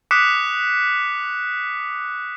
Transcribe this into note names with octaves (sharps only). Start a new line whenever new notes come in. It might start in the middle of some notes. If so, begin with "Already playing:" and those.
D6 D#6 F#6 B6 C#7 E7